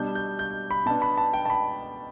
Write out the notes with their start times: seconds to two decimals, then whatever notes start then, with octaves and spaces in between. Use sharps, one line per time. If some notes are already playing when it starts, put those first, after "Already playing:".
Already playing: B2 G3 D4 G6
0.15 G6
0.39 G6
0.71 B5
0.86 B2 B3 D4 A5
1.02 B5
1.18 A5
1.33 G5
1.45 A5
1.50 B5